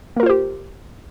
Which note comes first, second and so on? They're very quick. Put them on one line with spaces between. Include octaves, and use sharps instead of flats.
A#3 A#4 F4 C5 G4